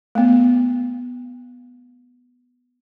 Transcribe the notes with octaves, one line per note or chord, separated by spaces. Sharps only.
A3 B3